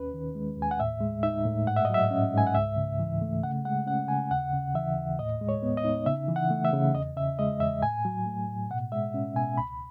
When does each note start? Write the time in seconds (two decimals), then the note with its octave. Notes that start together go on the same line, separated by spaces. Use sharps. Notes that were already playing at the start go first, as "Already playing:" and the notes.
Already playing: D#2 C#4 B4
0.14 D#3
0.35 G#3
0.58 D#2 G#5
0.71 F#5
0.80 A2 E5
1.01 G#3
1.23 D#4 E5
1.45 A2
1.67 G#2 F#5
1.77 E5
1.85 D#5
1.90 F#3 E5
2.10 C#4
2.34 G#2 G#5
2.47 F#5
2.55 C#2 E5
2.77 C#3
3.00 E3
3.22 A3
3.44 C#3 F#5
3.65 G#3 F#5
3.86 C#4 F#5
4.08 C#3 G#5
4.30 D#2 F#5
4.53 C#3
4.74 E3 E5
4.96 D#2
5.19 A2 D#5
5.41 G#3
5.49 C#5
5.63 B3
5.77 D#5
5.84 D#4
6.06 C#3 E5
6.29 E3
6.36 F#5
6.50 A3
6.65 E5
6.73 C#3
6.95 E2 D#5
7.17 C#3 E5
7.39 G#3 D#5
7.60 E2 E5
7.82 A2 G#5
8.05 F#3
8.27 A3
8.48 A2
8.70 B2 F#5
8.92 G#3 E5
9.14 C#4
9.36 B2 G#5
9.58 C#2 B5